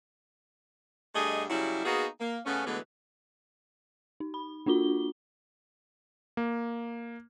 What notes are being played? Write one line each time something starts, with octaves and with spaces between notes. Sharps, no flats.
G2 A3 D4 G#4 D#5
C#3 F#3 G3 E4
A#3 B3 D#4 F#4 G#4
A#3
C#3 A3 B3 C#4
D3 E3 F#3 G#3 A3 B3
D#4
B5
A#3 D4 F4 F#4 G7
A#3